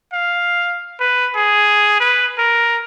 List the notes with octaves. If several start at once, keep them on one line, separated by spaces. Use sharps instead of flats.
F5
B4
G#4
B4
A#4